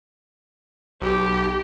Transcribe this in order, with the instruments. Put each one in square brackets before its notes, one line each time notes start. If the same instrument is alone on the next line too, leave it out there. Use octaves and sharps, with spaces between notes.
[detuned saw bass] B1 [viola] G4